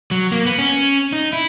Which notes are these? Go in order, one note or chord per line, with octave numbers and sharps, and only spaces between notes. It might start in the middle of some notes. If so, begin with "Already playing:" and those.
F#3
A#3
B3
C#4
D#4
E4